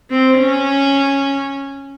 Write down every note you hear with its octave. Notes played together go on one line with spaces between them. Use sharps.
C4
C#4